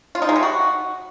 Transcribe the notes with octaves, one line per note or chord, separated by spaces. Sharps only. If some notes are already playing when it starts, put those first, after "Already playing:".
F4
D#4
G#3
G3
F#4